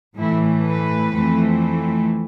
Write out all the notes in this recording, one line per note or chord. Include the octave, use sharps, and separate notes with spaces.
A2 E3 A3 E4
B4
F2 E3 A3 C4